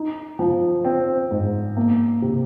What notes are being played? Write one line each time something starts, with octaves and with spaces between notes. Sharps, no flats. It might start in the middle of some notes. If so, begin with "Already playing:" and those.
Already playing: D#4
F3
C4
G#2
A#3
C3